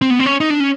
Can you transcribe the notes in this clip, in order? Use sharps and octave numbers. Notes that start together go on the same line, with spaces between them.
C4
B3
C4
C#4
D#4
D4
C#4